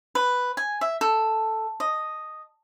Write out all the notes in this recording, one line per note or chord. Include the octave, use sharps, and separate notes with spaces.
B4
G#5
E5
A4
D#5